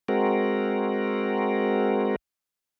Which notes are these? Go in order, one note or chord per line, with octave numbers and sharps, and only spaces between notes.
G#3 C4 F#4 A#4